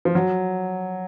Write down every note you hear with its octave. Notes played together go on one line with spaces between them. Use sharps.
F3
F#3